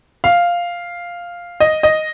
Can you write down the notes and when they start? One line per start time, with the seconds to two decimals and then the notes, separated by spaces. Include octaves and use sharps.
0.24 F5
1.60 D#5
1.83 D#5